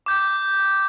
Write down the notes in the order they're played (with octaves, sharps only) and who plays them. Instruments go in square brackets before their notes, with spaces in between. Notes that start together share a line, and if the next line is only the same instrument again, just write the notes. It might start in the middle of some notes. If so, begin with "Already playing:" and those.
[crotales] D6 G6